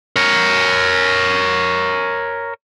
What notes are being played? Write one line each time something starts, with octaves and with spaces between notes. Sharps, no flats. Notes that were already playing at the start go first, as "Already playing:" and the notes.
A#4 C#5